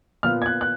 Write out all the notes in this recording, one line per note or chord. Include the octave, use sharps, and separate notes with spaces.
A#2 F3 B3 F6
G#6
F#6
F#6